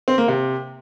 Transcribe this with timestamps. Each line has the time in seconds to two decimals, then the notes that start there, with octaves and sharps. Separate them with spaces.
0.08 C4
0.18 A#3
0.28 C3